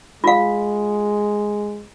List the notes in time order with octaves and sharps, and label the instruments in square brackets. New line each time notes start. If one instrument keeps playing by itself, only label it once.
[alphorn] G#3 [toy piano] F4 F5